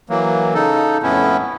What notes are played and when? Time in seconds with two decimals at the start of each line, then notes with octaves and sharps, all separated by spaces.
0.09 E3 F#3 A#3
0.54 C#3 D#4 A4
1.03 F2 A2 B3 C#4 E4